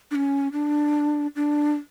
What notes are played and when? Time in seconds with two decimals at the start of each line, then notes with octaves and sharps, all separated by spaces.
0.11 D4
0.15 C#4
0.52 D4
1.36 D4